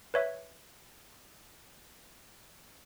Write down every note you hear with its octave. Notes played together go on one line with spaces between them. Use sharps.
B4 C#5 E5